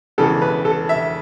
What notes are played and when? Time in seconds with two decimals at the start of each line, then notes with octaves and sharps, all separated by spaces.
0.18 E1 E2 C#3 E3 A4
0.42 B4
0.65 A4
0.89 E5